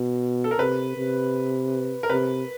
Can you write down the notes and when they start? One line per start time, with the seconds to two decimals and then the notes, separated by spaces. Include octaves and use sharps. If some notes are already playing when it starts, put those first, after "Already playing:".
Already playing: B2
0.44 A4
0.51 A#4
0.59 C3 B4
0.97 C3
2.03 A#4
2.10 C3 B4